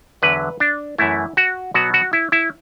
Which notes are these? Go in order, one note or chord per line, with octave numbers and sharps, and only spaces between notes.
E2 D3 F#3 B4
D4
F#2 E3 A3 E4
F#4
B2 F#3 B3 F#4
F#4
E4
E4